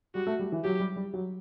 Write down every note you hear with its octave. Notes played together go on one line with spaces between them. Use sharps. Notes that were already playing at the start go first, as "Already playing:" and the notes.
G3 F#4
A3
G3
E3
F#3 G4
G3
G3
F#3